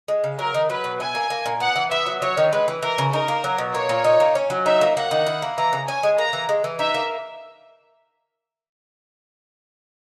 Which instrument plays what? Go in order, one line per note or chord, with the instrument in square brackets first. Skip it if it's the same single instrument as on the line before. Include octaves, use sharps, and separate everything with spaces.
[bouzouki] G#3
C#3
[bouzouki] F#3 [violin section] A#4
[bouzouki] D#3
[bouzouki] F#3 [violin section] B4
[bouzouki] B2
[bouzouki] E4 [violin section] G#5
[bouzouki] A#3
A#3
A#2
[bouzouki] B3 [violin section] F#5
[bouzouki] E3
[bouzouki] B3 [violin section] E5
[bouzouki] F#3
[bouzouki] F#3 [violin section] C#5
[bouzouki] D#3
[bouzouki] G#3 [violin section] B4
[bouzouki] E3
[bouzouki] E3 [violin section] A#4
[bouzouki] C#3
[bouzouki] D#4 [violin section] A#4
[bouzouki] A#3
F#3
B2
[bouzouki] A#3 [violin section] C#5
[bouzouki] A#2
D#4
A#3
C#4
F#3
[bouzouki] D#4 [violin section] E5
[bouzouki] A#3
[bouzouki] A#3 [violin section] F#5
[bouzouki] D#3
E4
A#3
[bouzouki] E3 [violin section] A#5
[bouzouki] C#3
[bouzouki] C#4 [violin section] G#5
[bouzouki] G#3
[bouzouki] A#3 [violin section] A#5
[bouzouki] E3
G#3
E3
[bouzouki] D#4 [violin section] E5
[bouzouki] A#3